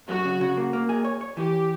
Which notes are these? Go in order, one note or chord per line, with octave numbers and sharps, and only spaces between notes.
F#2 F#4
C#3
C#3
A#3
A#3
G#4
C#5
C#5
E3 G4